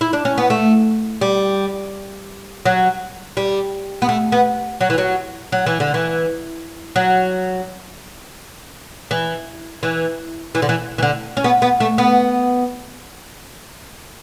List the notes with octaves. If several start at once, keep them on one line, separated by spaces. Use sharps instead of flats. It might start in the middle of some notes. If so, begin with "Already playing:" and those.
E4
D4
C#4
B3
A3
G3
F#3
G3
B3
A3
B3
F#3
E3
F#3
F#3
E3
D3
E3
F#3
E3
E3
E3
D3
E3
E3
D3
C#4
B3
B3
A3
B3